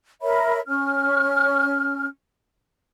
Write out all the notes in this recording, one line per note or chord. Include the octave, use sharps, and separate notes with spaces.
A#4 C#5 E5 B5
C#4 F6